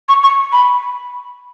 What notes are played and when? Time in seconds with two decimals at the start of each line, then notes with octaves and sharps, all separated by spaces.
0.09 C#6
0.23 C#6
0.52 B5